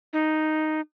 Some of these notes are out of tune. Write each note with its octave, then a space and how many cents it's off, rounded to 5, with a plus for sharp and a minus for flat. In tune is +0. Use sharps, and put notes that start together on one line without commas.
D#4 +0